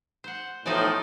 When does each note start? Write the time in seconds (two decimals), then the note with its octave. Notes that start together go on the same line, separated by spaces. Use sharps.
0.24 C5 F#5
0.66 B1 A2 E3 F3 D#4 C5 D5